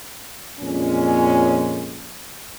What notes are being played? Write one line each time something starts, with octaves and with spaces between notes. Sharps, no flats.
F2 A#2 G#3 C#4